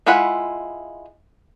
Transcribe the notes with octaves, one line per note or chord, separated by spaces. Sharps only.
G#3 E4 F4 F#5 B5